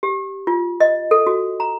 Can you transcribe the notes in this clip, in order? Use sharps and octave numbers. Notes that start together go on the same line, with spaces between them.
G4
F4
D#5
A4
F#4
A#5